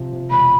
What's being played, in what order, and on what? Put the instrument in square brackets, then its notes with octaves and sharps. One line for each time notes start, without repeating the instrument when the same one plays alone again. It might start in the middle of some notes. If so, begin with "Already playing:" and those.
Already playing: [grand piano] C3 F3
C3
[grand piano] E1 [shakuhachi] B5